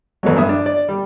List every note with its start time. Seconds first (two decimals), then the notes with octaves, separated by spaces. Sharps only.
0.23 A1 G#2 B2 F#3
0.37 G2 E5 D#6
0.49 D4
0.66 D5
0.89 G3